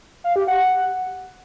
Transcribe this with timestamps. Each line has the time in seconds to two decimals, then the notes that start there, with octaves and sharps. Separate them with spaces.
0.24 F5
0.36 G4
0.47 F#5